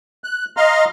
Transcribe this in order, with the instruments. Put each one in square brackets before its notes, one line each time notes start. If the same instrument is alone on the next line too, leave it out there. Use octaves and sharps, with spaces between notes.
[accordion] F#6
D#5 F5 A#5 C6 F6